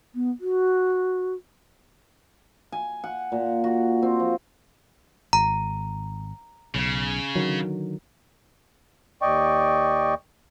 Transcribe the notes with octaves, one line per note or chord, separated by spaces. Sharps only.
B3
F#4
G#5
F#5
A#2
F#4
C4
F3
G#1 A#5
B1 C#3
D3 D#3 F#3
D#2 D5 D#5 G5 C#6